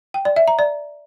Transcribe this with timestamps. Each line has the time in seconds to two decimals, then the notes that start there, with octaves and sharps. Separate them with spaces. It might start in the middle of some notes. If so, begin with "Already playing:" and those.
0.14 G5
0.25 D5
0.36 E5
0.48 A#5
0.59 D5